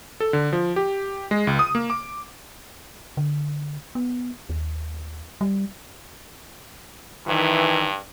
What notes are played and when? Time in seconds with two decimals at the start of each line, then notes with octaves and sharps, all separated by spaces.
0.20 A4
0.33 D3
0.53 F3
0.76 G4
1.31 G#3
1.47 C#2
1.59 D#6
1.75 A#3
1.90 D6
3.17 D3
3.95 B3
4.50 D#2
5.41 G3
7.27 G2 D#3 E3